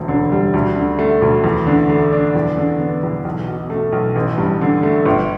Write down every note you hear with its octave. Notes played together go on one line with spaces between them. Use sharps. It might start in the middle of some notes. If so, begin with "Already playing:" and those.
Already playing: E1 D2
D3
G3
D2
D3
A3
D2
E2
D3
A3
D4
E2
D3
B3
E2
B1
B2
A3
B1
A1
G2
D3
A3
G1